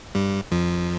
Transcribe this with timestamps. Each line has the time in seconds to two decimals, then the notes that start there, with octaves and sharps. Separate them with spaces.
0.15 G2 G3
0.51 F2 F3